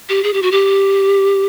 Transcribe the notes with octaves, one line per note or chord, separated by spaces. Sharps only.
G4
G#4
G4
F#4
G4